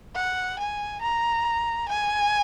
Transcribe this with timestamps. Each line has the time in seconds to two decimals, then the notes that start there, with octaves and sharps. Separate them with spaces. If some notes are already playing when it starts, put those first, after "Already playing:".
0.15 F#5
0.59 G#5
1.01 A#5
1.88 G#5